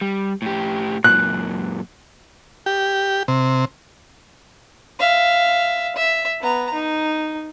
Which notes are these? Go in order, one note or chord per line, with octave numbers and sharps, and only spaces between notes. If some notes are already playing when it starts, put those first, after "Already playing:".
G3
A2 G4
F#2 A#2 F#6
G4
C3
E5 F5
E5
B3 A#5
D#4